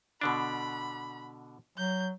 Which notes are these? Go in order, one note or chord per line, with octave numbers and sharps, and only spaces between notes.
B2 D3 D4 B5
F#3 G6